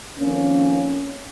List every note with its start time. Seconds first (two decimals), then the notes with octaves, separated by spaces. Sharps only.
0.18 F2 D#3 A#3 C#4